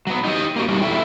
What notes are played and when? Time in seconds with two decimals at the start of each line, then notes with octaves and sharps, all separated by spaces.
0.07 F#3 B3
0.25 D#4 G4 C#5 D#5
0.56 A#3 F#4
0.68 G3 G#3 D#4 F#4
0.82 E2 E4 F#4 A4 E5 G5